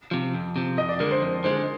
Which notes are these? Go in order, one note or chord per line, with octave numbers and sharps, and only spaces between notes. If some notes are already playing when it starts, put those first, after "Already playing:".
C3 F3
F2
C3 F3
F2 D#5
D5
D3 G#3 A#4
C5
F2
D3 G#3 C5